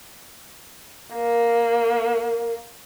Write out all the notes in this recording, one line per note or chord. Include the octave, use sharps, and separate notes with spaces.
A#3 A#4